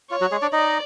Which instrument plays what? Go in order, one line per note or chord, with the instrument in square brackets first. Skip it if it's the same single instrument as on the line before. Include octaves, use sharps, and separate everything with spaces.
[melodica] F4 [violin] C#5
[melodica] F#3 F#4
G#3 G#4
D4 D5
[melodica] D#4 D#5 [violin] D5